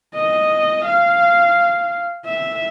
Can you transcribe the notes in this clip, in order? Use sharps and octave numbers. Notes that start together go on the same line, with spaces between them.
D#5
F5
E5